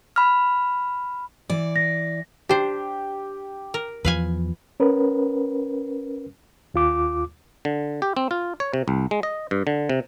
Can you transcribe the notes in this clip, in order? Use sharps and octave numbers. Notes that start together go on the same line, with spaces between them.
B5 F6
E3 D5
A#6
D4 G4 C5
A#4
E2 F3 B4 F5 G#5
C#4 A#4 B4
D#2 F4 D6
D3
G4
C4
F4
C#5
C3
C2
G#3
D#5
G2
D3
C3